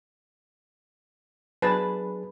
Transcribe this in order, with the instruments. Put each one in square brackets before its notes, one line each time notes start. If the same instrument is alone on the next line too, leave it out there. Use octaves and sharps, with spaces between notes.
[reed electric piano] F#3 D4 G#4 [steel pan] B4 A5